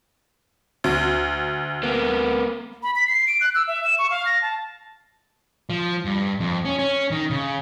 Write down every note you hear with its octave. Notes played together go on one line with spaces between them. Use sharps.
D2
A#3 B3
B5
B6
C7
D7
F#6
E6
E5
E7
C#6
F5
A#6
A5
F3
G2
F2
C#4
C#4
D#3
C#3